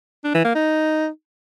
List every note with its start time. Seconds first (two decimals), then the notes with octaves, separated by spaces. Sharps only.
0.24 D4
0.34 E3
0.45 A#3
0.55 D#4